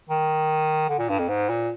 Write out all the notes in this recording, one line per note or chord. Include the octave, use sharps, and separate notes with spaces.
D#3
D3
A#2
G2
F2
G#2
A#2